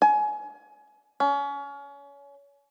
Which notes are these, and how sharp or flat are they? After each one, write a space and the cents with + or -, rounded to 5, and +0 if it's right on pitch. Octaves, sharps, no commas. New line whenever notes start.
G#5 +25
C#4 +30